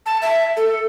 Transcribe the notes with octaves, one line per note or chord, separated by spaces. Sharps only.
A5
E5
A4